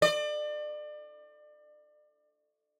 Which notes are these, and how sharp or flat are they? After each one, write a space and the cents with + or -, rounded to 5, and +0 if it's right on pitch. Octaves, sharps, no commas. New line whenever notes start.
D5 +35